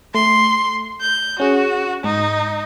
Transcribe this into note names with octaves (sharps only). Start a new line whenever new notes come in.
A3 C6
G6
C#4 F#4 G#4
G#2 D#4